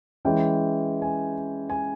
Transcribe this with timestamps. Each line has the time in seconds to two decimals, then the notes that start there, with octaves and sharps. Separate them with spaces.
0.25 E3 G#3 C#4 E4 G5
1.02 G#5
1.70 G#5